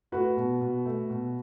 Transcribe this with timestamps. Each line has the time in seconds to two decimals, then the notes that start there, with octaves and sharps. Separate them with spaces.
0.12 A3 F#4 B4
0.37 B2
0.61 B2
0.85 A3
1.10 B2